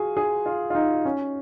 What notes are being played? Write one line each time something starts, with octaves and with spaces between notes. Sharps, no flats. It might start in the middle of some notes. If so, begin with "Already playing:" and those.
Already playing: F4 F#4 G#4
G#4
F4
F4
D#4
C#4